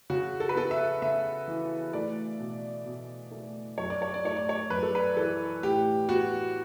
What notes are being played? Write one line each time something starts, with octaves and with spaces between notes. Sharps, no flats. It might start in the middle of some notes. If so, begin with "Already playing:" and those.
C#3 F#4
A4
B4
B3 A4
E5
C#3 E5
E3
A3 D5
B2
B2
A3
F#2 C#5
D5
C#5
D5
A3 C#5
D5
C#5
F#2 B4
A4
B4
E3 A4
A2 G4
B3 F#4